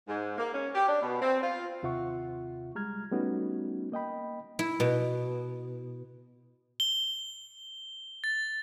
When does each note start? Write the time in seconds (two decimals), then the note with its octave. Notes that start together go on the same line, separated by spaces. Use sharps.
0.08 G#2
0.38 A#3
0.53 C#4
0.75 G4
0.87 D4
1.02 B2
1.21 C4
1.42 F4
1.83 D#2 C3 F4 E5 F#5 C#6
2.75 G3 G#3 A#5 F6 G#6
3.12 G3 A3 B3 C#4 D#4 F#4
3.92 A#3 D#5 G5 B5
4.59 E4
4.80 B2
6.80 G7
8.24 A6